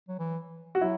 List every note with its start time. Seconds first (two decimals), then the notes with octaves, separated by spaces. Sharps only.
0.08 F#3
0.19 E3
0.75 F#4
0.81 F#3 E4